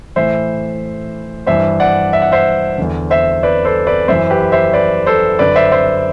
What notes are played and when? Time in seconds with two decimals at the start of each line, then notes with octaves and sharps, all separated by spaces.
0.16 A2 E3 C5 E5
1.46 G2 E3 C5 E5
1.80 D5 F#5
2.13 E5
2.22 F#5
2.32 C5 E5
2.78 E2 D3
3.10 C5 E5
3.43 B4 D5
3.65 A4 C5
3.87 B4 D5
4.08 F#2 E3 C5 E5
4.30 G4 B4
4.52 C5 E5
4.73 B4 D5
5.06 A4 C5
5.39 F#2 D3 B4 D5
5.55 C5 E5
5.72 C5 E5